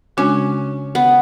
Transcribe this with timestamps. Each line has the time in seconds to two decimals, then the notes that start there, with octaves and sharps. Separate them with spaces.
0.17 C#3 G#3 C#4 D4 F#4
0.95 B3